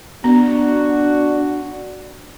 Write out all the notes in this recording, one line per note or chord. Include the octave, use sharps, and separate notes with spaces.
B3 D4 F#4